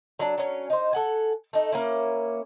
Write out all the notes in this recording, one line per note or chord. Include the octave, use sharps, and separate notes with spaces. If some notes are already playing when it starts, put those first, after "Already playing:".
F#3 D4
F#3 C#4
D#4 C5
A4 F#5 G#5
A3 D#4
A#3 C#4 E4